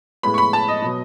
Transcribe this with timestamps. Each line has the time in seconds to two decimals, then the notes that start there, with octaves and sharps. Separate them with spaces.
0.23 A2 G#3 B3 B5
0.34 C#6
0.38 B5
0.53 A5
0.68 D#5
0.82 B2 F#3 B3